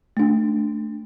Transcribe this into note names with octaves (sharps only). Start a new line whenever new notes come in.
A3 D4